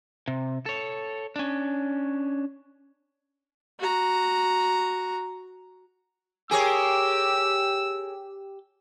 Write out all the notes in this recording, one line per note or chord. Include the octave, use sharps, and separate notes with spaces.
C3
A4 C#5
C#4 D4
F#4 A#5
G4 G#4 A#4 C#5 G#5 E6